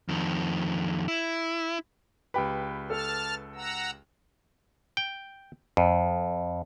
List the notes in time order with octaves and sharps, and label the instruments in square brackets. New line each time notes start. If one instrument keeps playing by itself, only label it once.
[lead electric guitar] F2 D#3
E4
[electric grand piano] C#2 G4 B4 [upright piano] G5 B5
[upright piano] A4 [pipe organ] A5 F6
[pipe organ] F#5 A#5 E6
[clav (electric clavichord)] G5
F2